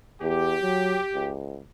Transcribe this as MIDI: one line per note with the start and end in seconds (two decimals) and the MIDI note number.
0.22 0.56 40
0.22 1.32 67
0.62 0.99 54
1.14 1.61 37